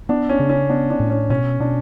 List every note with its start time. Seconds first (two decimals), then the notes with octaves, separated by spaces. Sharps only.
0.09 B3 D4
0.29 C#4
0.40 C#3
0.49 C#4
0.69 B3 D4
0.90 D4
1.00 A2
1.10 C#4
1.30 B2 C#4
1.60 B2 D4